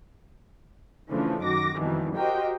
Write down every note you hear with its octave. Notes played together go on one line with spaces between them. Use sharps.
C#3 E3 F3 A3 D4
F#2 D#3 F#4 D6 A#6
F2 B2 D#3 E3 G3
F#4 G4 A#4 C5 D#5 G5